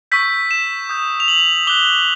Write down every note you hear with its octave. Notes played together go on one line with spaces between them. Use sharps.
C#6 E6 G6 B6
E7
D#6 G6
F7
F#7
D6 F#6 G7